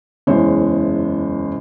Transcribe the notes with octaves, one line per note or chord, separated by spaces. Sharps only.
F#1 E2 G#3 C5 C#5